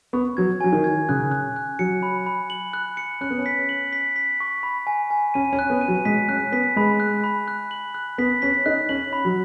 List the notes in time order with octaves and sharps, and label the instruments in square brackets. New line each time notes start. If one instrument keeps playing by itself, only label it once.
[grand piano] B3 [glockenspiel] C#6
[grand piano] F#3 [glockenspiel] G#6
[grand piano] F#3 [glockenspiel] G#5
[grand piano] D#3
[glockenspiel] G#6
[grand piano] C#3 [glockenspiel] F#6
[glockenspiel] F#6
F#6
[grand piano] F#3 [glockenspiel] C#7
[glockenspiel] B5
B5
F#7
F#6
C#7
[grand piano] C#4 [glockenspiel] F#6
[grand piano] B3
C#4
[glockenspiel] B6
F#7
B6
B6
C#6
B5
G#5
G#5
[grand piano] C#4 [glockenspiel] D#7
[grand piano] C#4
[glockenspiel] F#6
[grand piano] B3
[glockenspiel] D#7
[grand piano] F#3
[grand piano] G#3 [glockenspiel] B6
[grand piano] C#4 [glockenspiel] F#6
[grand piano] B3 [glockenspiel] B6
[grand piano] G#3 [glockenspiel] B5
[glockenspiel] F#6
B5
F#6
F#7
F#6
[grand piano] B3 [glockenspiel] B6
[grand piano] C#4 [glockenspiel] B6
[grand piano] D#4 [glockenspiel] F#6
[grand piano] C#4 [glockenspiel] F#7
[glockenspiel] B5
[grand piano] F#3